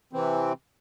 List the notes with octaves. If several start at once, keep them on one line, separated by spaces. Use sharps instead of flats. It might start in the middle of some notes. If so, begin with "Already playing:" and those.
C3 E3 C4